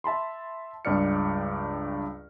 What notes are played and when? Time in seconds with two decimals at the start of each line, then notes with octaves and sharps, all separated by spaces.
0.04 E5 A5 B5 C6
0.85 C#2 G2 G4 D5 F6 C#7